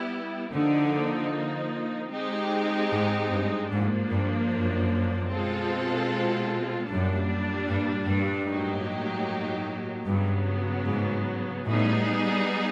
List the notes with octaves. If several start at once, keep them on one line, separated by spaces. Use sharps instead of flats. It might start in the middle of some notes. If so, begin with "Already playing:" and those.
Already playing: G3 B3 E4 G4
D3 F3 A#3 D#4
G#3 C4 D#4 G4
G#2
G2
G#2 F3 A#3 D4
G2
F#2
B2 G#3 C4 F4 A4
F#2 A#2 G3 A#3 D4
G2
G2
A2 F#3 A#3 D#4 G4
G2 C#3 F#3 B3
G#2
A2 G3 B3 D#4 G#4